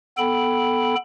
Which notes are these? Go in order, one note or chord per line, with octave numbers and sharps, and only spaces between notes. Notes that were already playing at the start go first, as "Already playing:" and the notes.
B3 A4 G5 B5